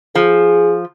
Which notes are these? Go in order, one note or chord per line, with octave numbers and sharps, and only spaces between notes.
F3 G#4